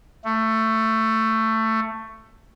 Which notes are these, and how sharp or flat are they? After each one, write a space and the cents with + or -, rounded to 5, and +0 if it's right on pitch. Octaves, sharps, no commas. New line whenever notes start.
A3 +15